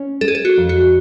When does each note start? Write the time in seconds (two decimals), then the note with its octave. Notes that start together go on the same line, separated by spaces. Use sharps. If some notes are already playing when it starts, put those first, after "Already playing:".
Already playing: C#4
0.21 G#3 A4
0.28 G#4
0.35 A4
0.45 F#4
0.57 F2
0.69 F#4